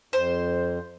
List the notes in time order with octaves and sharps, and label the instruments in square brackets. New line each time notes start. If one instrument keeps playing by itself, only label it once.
[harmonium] F2 [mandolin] C5